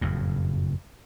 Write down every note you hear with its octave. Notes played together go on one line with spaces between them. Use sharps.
F#1 F2 A2